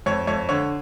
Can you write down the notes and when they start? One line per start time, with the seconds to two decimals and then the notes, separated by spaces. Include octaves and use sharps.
0.06 F2 C#5
0.27 F2 C#5
0.49 D3 C#5